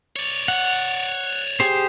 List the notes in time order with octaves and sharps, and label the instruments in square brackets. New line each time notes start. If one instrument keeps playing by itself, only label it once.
[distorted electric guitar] C#5 D5
[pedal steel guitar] F#5
G4 G#4 C5